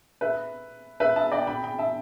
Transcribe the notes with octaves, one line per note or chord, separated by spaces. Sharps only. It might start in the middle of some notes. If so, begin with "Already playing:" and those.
B4 E5
B4 E5
E5 A5
D5 G5
G5 B5
G5 B5
E5 A5